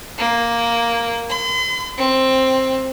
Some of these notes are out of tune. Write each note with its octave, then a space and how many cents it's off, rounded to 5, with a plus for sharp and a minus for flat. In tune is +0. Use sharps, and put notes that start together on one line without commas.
A#3 +0
C6 -45
C4 +10